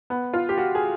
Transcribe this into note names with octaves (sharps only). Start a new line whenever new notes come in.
B3
F4
G4
F#4
G#4